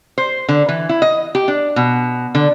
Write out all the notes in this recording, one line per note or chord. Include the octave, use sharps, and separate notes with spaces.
C5
D3
E3
E4
D#5
G4
D4
B2
D3